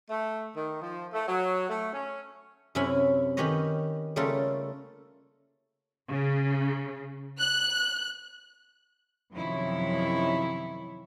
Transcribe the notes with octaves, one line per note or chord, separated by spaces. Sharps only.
A3
D#3
F3
A3
F#3
A3
C#4
F#2 C3 C#4 E4 G#5 B5
D#3 C#4 G4 B4 C#5 D#5
C#3 G3 A3 A#3 F4 A4
C#3
F#6
F#2 C3 D#3 F3 E4 C#5